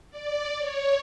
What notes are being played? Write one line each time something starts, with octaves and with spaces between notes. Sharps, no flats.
D5
C#5